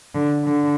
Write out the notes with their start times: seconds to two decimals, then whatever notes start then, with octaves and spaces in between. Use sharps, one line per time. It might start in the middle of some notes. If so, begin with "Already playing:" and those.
0.14 D3
0.44 D3